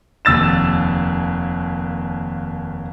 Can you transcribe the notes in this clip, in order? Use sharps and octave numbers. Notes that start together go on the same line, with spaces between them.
F1 D#2 E6 A6 E7